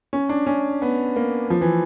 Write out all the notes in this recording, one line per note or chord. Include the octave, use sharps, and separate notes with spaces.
C#4
D4
C#4
B3
A#3
F3
E3